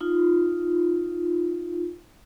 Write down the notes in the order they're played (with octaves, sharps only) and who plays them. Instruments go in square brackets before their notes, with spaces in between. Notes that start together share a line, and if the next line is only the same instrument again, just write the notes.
[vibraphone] D#4 F4